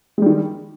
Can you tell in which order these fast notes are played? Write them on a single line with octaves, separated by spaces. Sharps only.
G#3 G3 D#3